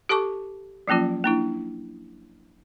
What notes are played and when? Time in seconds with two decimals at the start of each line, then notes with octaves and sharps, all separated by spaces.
0.09 G4 A4 A5 C#6 D6
0.88 F3 F#3 A#3 C#4 F4
1.24 A#3 D4 E4